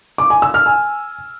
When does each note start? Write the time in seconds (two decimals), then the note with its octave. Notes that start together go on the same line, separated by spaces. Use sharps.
0.18 D6
0.30 G#5
0.42 E6
0.54 F6
0.66 G#5